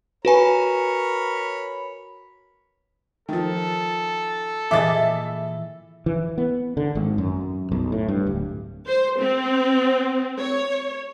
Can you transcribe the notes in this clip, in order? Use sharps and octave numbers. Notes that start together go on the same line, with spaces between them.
F#4 A#4 B4 C#5 G#5 B5
D#3 F3 A4
A#2 E3 G#4 D#5 E5 D6 A6
E3
B3
D3
G#1
F#2
B1
A2
G2
D1
C5
C4
C#5